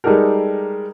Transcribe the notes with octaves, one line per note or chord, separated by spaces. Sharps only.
G3 G#3 D#4 G4 A4 A#4